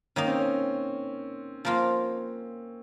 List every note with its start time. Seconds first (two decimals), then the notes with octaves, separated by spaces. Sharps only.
0.16 D#3 A#3 C#4 D#4
0.28 C4
0.39 C#4
1.65 F3 A#3 F4